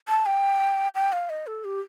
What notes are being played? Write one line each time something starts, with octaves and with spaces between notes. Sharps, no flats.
A5
G5
G5
F5
D#5
A4
G4